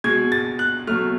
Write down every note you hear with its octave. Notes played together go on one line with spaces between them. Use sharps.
B2 G#3 G#6
A6
F#6
B2 F#3 A3 F6